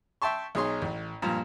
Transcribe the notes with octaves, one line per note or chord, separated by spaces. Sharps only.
E5 G5 A5 C6 C#6
B1 D#4 G#4 C#5 C6
A1
G2 A#2 F3 A#5